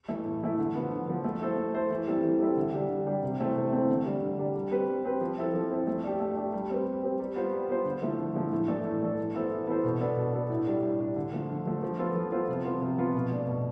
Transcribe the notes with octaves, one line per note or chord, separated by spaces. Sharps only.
E3 A3 E4
A2
E3 A3 E4
D3
F3 B3
D3
F3 B3
A3
E4 A4 C5
A3
E4 A4 C5
E3
G3 C4 E4 A4
E3
G3 C4 E4 A4
D3
G3 D4 G4
D3
G3 D4 G4
C3
E3 A3 C4
C3
E3 A3 C4
D3
G3 D4
D3
G3 D4
G3
C4 G4 B4
G3
C4 G4 B4
F3
C4 E4 A4
F3
C4 E4 A4
A3
D4 G4
A3
D4 G4
G3
C4 G4 B4
G3
C4 G4 B4
G3
B3 F4 C5
G3
B3 F4 C5
D3
F3 A3 E4
D3
F3 A3 E4
A2
E3 A3 D4 A4
A2
E3 A3 D4 A4
E3
B3 E4 A4 C5
E3
B3 E4 A4 C5
B2
B3 D4 A4
B2
B3 D4 A4
A2
G3 D4
A2
G3 D4
D3
F3 A3
D3
F3 A3
F3
B3 F4 A4 C5
F3
B3 F4 A4 C5
C3
F3 B3 F4
C3
F3 B3 F4
B2
A3 D4
B2